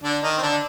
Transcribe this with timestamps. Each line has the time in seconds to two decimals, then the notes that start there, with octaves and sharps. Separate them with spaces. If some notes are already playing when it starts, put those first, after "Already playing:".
0.03 D3 D4
0.22 D#3 D#4
0.37 C4
0.43 D3 D4